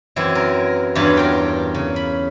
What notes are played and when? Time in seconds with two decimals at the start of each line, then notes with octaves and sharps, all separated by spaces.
0.16 F#2 E3 F#3 C4 E4
0.35 A#4
0.95 E2 G2 F#3 F4 B4 F#5
1.17 A#4 G5
1.74 C#3
1.96 B5